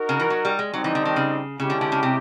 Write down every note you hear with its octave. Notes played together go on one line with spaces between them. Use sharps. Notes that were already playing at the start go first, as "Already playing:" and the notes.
Already playing: D#4 F#4 A#4
C#3
E3
F#3
G3
G#3
F#3 G3 C4 D#4
E3
D3
D#3
C#3
C#3 G#3 C#4 E4 G4
D3
D3
C#3
C3